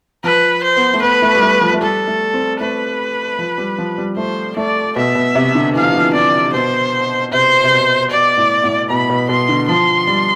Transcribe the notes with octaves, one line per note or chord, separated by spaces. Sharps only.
F3 B4
C5
B3
A3
B3 B4
A3
G3
A3
F3
A3
G3 A4
A3
C4
A3 B4
F3
G3
F3
G3
A3 C5
A3 D5
B2 E5
B2
C3
D3
E3 F5
F3
E3
F3
E3
D3 D5
B2 C5
C3 C5
C3
B2
B2 D5
A2
A2
B2 B5
B2
B2 C6
D3
F3 C6
G3